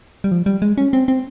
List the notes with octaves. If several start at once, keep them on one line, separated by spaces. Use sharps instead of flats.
G3
F3
G3
G#3
C#4
C4
C4